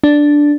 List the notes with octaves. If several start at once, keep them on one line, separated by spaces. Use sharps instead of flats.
D4